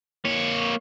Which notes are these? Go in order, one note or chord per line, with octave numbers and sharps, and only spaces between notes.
A#3 C#5